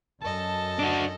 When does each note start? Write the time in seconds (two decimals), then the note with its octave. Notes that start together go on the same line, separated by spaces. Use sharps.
0.22 F#2 A4 D#5 A5
0.79 D4 F#4